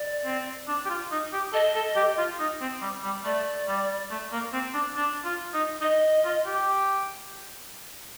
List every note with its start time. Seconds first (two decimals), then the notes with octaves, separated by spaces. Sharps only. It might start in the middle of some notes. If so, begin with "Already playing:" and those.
Already playing: D5
0.25 C4
0.68 D4
0.86 G4
0.90 F4
1.12 D#4
1.33 G4
1.53 A4 D#5
1.75 A4
1.96 G4
2.18 F4
2.40 D#4
2.61 C4
2.82 G3
3.04 G3
3.25 A3 D5
3.68 G3
4.11 A3
4.32 A#3
4.53 C4
4.74 D4
4.96 D4
5.25 F4
5.54 D#4
5.81 D#4 D#5
6.25 F4
6.46 G4